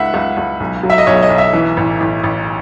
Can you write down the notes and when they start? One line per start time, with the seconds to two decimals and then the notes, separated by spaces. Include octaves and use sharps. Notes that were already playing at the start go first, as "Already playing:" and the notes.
Already playing: C#2 D#4 E5 F#5
0.14 C#2
0.37 C#2
0.60 B1
0.83 F#3
0.90 E5
0.98 D#5
1.07 B1 C#5
1.22 D#5
1.30 B1
1.38 E5
1.53 E3
1.77 A1
2.00 A1
2.23 A1